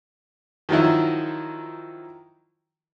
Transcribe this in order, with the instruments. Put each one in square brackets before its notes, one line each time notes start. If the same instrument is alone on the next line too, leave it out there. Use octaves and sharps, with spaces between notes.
[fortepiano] D#3 F3 F#3 D#4 E4